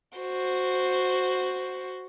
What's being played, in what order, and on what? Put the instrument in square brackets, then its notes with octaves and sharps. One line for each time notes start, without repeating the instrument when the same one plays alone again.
[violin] F#4 C5